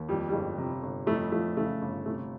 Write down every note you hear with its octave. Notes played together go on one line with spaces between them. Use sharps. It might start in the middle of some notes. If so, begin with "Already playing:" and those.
Already playing: D#2
F2 G3
G3
G1 G#3
C3
G1
F2 A3
F3 A3
C#3 A3
G1
C3 A3